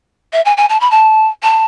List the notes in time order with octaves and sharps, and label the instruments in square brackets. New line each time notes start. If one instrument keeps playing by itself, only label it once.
[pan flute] E5
G#5
G#5
A5
B5
A5
A5